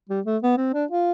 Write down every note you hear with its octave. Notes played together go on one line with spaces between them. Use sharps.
G3
A3
B3
C4
D4
F4